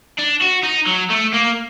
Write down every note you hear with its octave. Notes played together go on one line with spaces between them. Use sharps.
D4
F#4
D#4
F#3
A3
A#3